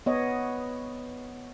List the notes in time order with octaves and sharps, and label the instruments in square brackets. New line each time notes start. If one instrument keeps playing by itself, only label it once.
[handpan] B3 C#5 D#5